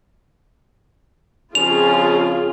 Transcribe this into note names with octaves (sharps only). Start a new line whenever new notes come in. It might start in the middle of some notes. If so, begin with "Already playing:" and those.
F2 C#3 C#4 F4 G#4 F7